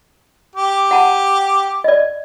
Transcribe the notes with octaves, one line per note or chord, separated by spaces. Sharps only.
G4
F#5 A5
D5 D#5